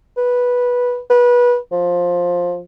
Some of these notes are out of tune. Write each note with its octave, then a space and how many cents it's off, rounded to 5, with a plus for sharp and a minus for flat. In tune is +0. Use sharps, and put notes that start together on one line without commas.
B4 -10
B4 -25
F3 +10